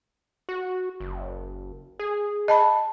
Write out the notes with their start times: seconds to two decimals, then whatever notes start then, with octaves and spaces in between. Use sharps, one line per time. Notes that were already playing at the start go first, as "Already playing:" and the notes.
0.49 F#4
1.00 F#1
1.99 G#4
2.48 D#5 A5 B5